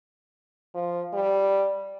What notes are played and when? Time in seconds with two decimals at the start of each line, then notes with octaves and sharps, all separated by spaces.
0.74 F3
1.13 G3